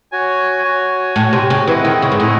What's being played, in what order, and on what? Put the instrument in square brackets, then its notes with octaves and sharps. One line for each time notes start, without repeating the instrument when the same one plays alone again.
[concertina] F#4 C#5 G#5
F#4 C#5 G#5
[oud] A2 [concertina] F#4 C#5 G#5
[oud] C3
C#3
[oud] E3 [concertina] C4 E4 G#4 D#5 F#5
[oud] D#3
C#3
G#2
[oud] A2 [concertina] C4 E4 G#4 D#5 F#5